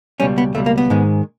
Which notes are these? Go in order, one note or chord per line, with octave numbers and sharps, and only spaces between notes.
C#2 B2 G3 C#4
B3
C#2 B2 G3 A3
A#3
B3
G#2 D#3 G#3